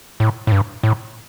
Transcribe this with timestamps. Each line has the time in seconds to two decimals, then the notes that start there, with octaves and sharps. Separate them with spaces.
0.20 A2
0.47 A2
0.52 G2
0.83 A2